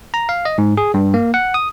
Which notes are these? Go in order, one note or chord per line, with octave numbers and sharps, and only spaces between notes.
A#5
F5
D#5
G#2
G#4
G2
A#3
F#5
D#6